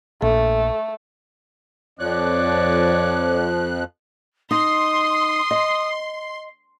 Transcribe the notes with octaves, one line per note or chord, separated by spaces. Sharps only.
A#1 A3 A4
F2 F3 C4 C#5 D5 F#6
D#4 C6 D#6
D#5